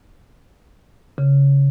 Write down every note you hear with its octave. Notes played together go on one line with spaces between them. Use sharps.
C#3